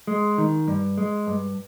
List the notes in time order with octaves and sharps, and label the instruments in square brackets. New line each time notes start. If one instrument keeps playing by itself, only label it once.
[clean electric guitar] G#3
D#3
G2
G#3
G2